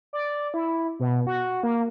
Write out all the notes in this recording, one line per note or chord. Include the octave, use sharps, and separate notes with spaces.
D5
E4
B2
F#4
A#3